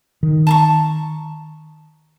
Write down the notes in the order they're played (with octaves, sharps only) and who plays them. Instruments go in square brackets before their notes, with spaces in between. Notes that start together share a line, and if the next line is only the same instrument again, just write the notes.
[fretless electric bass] D#3
[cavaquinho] A5 A#5 C#6